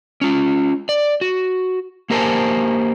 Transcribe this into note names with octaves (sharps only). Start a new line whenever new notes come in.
C#4 F4
D5
F#4
A#3 G4 A#4 C5 G#5 A5